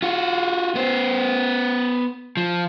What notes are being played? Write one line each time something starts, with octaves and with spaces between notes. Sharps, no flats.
F4 F#4
B3 C5
F3